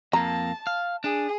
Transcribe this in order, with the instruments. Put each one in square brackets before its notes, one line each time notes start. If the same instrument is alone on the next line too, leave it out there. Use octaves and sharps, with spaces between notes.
[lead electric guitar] F2 A#3 [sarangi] A5 [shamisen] A#5
[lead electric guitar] F5
[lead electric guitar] D4 [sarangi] G#4